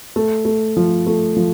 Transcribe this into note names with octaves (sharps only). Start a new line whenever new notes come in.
A3
A3
F3
A3
F3